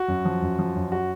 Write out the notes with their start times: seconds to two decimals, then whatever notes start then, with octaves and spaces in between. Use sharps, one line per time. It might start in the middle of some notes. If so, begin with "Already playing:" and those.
Already playing: F#4
0.08 F#2
0.25 F3
0.42 F#2
0.59 F3
0.75 F#2
0.92 F#4